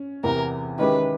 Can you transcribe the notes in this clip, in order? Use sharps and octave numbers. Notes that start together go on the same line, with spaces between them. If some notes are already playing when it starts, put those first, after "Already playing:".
Already playing: C#4
E2 C3 E3 A#4
D#3 G#3 C#4 E4 G4 B4